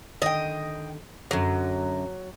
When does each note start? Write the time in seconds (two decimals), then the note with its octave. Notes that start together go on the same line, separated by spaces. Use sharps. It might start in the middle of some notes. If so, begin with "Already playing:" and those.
0.22 D3 D#3 D#5 G5
1.31 F#2 D3 F#3